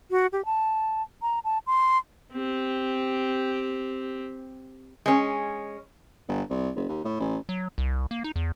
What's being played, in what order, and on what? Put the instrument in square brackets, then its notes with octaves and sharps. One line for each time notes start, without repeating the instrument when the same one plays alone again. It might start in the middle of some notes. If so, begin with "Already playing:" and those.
[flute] F#4
G4
A5
A#5
A5
C6
[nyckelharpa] C4 G4
[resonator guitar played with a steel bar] G#3 C#4
[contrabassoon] G1
C2
F#1
D#2
A2
A1
[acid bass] F#3
C2
A#3
D#4
E2